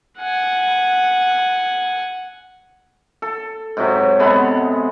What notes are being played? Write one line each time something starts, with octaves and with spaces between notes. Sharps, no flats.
F#5 G#5
A4
G#2 C3 F#3
C3 G#3 B3 A4